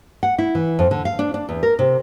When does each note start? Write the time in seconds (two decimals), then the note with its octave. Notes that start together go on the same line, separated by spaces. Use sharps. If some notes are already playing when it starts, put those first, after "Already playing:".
0.23 F#5
0.38 E4
0.55 E3
0.79 F2
0.91 D3
1.05 F5
1.19 D4
1.34 D4
1.49 E2
1.63 A#4
1.79 C3